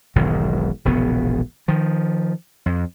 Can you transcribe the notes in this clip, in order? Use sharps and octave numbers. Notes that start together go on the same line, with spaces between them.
E1 B1 G#2 D#3
E1 A#1 C#3 B3
D#3 F3
F2